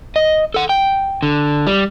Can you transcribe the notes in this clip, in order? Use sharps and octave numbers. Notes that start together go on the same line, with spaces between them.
D#5
A4 F#5
G5
D3
G3